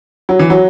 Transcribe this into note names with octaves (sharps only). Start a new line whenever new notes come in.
F#3
E3
F#3